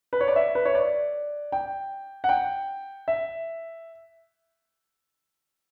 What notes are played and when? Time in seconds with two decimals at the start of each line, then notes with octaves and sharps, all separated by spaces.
0.13 B4
0.21 C#5
0.28 D5
0.36 E5
0.55 B4
0.66 C#5
0.75 D5
1.52 G5
2.24 F#5
2.29 G5
3.08 E5